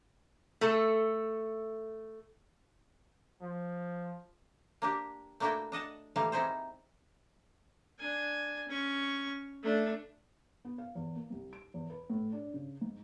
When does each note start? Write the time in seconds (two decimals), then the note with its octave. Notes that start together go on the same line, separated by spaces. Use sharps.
0.61 A3 A4
3.42 F3
4.82 A#3 D4 G4
5.40 A3 A#3 D4 E4 F#4 G5
5.72 D4 D#5 F#5 A5
6.16 D#3 E3 G3 A3 A#3 F5
6.32 G3 C4 D#4 E4 G#4 C5
7.99 D4 G#5
8.68 C#4 C#6
9.63 A3 D4
10.65 B3
10.78 F5
10.95 E2
11.16 A#3
11.30 C2
11.53 D7
11.74 E2
11.90 B4
12.10 A2
12.33 D4
12.54 C#3
12.81 G#2